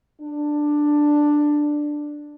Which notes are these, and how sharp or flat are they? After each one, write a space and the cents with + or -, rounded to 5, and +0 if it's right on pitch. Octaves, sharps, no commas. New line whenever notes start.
D4 +5